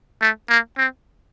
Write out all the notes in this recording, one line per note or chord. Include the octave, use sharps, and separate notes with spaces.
A3
A#3
C4